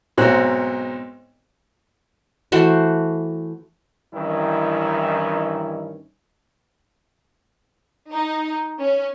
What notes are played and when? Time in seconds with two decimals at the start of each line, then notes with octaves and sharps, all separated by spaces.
0.18 B1 G#2 C4 F#4 C#5 F#6
2.52 E3 A3 F#4 C5
4.13 G2 D#3 E3 C#4 D#4 E4
8.12 D#4
8.80 C#4